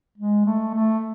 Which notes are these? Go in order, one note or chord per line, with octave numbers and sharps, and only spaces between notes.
G#3
A3
A3